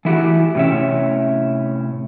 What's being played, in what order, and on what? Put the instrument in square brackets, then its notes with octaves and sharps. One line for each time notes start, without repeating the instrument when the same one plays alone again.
[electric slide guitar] E3 A3 E4 F#4 G4
A2 C3 C#4 C#5 E5